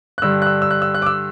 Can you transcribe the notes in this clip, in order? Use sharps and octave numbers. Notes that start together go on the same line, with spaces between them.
F#6
G2 D3 G3 E6
F#6
E6
E6
F#6
E6
F#6
D6
E6